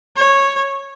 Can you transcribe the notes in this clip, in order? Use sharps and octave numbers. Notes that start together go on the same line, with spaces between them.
C#5